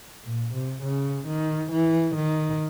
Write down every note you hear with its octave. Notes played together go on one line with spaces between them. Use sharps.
A#2
C3
C#3
D#3
E3
D#3